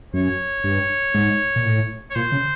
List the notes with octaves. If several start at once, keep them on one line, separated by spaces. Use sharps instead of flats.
F#2 C#5
G2
G#2
A#2
A2
C#5
A#2 C5
C#3